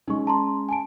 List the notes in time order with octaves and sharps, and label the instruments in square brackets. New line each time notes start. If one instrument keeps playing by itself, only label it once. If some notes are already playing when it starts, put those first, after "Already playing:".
[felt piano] G#3 C#4 [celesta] D#4 C#6
[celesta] A5 A#5 C6
G#5 A5 D7